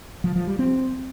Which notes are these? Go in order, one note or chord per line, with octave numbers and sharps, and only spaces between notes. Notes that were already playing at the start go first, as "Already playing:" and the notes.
F3
F3
G3
C4